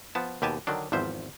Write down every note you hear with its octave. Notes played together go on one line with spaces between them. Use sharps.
F3 B3 A5
D#2 B2 G4 G#5 A5
D3 D#3 F#3 D4
G#1 E2 F3 C5 E5